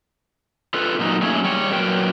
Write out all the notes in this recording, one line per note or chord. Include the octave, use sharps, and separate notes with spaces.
F4 A4 B4
A#2 F#3 D#4
F#3 A3 A#3 C#4 G#4
G3 C#5
A#2 F#3 F#4 A#4 B4 G5